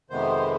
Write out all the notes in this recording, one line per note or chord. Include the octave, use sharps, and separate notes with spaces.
F2 C3 D#3 G#3 B3 C5